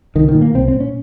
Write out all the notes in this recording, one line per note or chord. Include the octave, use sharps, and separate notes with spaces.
C2 D#3
D#3
A#2
A#3
C2 C4
C4
A#2
C#4